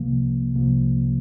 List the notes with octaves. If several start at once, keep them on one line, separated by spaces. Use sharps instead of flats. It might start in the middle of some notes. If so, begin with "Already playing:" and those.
Already playing: C2 C3 F3 A#3
C2 C3 F3 A#3